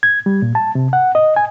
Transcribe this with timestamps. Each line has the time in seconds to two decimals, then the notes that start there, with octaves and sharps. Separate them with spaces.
0.03 G#6
0.26 G3
0.42 A#2
0.55 A5
0.75 C3
0.93 F#5
1.15 D#5
1.36 G#5